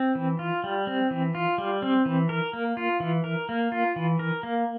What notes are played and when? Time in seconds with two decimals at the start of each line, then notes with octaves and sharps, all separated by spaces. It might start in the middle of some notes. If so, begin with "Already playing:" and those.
Already playing: C4
0.15 E3
0.39 F4
0.64 G3
0.87 C4
1.11 E3
1.35 F4
1.58 G3
1.82 C4
2.05 E3
2.29 A#4
2.53 A#3
2.77 F4
3.00 E3
3.24 A#4
3.49 A#3
3.72 F4
3.96 E3
4.19 A#4
4.43 A#3